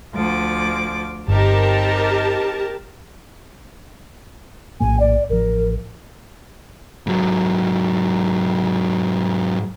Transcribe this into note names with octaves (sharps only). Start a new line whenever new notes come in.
D2 F3 D6
G1 C4 D#4 G4 A#4 A5
A#1 A2 A#3 G#5
D5
A1 F3 A#4
G#2 F#3